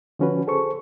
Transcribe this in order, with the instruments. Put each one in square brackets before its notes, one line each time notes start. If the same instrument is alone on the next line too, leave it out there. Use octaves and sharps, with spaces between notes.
[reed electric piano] D3 F3 C#4 F#4 B4
G#4 A4 C5 C#6